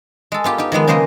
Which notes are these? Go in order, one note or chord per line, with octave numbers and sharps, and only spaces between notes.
G#3 A4
B3 F4 G4
D#4 G4
D#3 F3 G#3 B3
C#3 G#3 A#3 C5 D#5